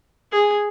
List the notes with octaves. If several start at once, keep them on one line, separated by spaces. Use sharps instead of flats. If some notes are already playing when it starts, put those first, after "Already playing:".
G#4